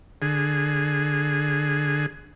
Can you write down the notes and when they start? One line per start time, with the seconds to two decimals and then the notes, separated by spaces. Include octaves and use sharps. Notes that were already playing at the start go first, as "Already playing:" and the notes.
0.22 D3 G#4